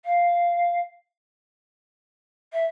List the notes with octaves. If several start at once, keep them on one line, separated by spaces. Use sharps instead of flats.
F5
E5